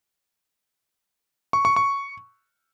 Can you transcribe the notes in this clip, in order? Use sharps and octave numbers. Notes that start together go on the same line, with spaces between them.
C#6
C#6
C#6